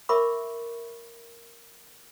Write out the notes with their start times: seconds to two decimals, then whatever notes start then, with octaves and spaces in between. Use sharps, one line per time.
0.09 A#4 E5 B5 C#6 D6